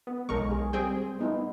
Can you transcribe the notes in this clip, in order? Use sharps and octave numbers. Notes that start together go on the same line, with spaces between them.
B3
B1 G#3 A#4 C#6
G#4
G3 C4 G#4 G5
B3 D#4 E4